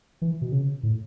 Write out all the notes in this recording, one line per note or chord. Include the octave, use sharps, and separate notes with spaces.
E3
B2
C#3
A2